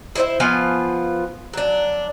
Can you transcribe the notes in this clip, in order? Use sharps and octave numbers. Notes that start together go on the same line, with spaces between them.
E4 C5 E5
F3 B3 F4 G#5
F#3 D4